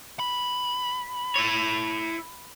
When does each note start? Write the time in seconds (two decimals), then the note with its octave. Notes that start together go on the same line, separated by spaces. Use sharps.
0.19 B5
1.36 E4 C#5